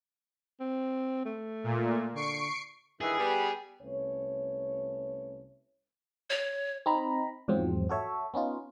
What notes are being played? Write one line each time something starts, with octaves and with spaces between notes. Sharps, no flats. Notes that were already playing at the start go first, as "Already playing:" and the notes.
C4
A3
A#2
D3 C#6 C7 D7
G2 D#3 E3 G#4
G3 B3
C2 A3 C#4 B4 C#5
C#5
C4 D#4 A#5 B5
E2 G#2 F3 F#3 C4
F#4 A4 C#5 E5
B3 C#4 D#4 F4